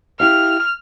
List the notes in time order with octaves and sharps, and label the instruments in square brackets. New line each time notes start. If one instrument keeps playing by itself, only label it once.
[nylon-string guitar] E4 G4 F5 [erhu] F6